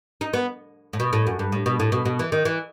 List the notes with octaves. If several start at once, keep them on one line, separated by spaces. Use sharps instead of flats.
D#4
B3
A2
B2
A2
F#2
G2
A2
B2
A2
B2
B2
E3
D#3
E3